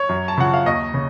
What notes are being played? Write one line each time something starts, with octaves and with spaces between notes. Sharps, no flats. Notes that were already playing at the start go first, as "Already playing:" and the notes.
Already playing: C#5
F#2
A5
C#3 F3 F#5
F5
D#2 D#5
C#3